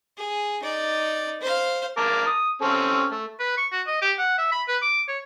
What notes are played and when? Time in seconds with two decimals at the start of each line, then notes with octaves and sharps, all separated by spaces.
0.17 G#4
0.63 D#4 D5
1.41 C5 F5
1.97 A#4 A5 D6
2.26 D#6
2.62 C4 C#4 A4
3.11 A3
3.40 B4
3.58 C#6
3.72 F#4
3.87 D#5
4.02 G4
4.18 F#5
4.38 E5
4.52 B5
4.68 B4
4.82 D6
5.08 C#5